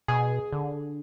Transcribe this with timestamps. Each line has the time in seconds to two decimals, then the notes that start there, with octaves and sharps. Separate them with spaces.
0.08 B2 G#4
0.52 D3